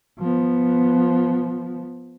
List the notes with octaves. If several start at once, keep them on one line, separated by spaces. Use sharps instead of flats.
F3 B3